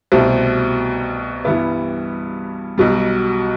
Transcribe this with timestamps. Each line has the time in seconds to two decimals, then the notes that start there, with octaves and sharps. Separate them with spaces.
0.12 C2 B2 A3 C4
1.44 G2 E3 G3 B3 E4
2.78 B1 B2 G3